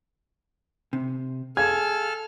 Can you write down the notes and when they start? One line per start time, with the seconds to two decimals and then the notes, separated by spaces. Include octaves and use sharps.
0.93 C3
1.57 G#4 A4 F5 F6 G#6